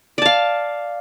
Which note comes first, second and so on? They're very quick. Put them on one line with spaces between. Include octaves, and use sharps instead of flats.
D5 A5 F5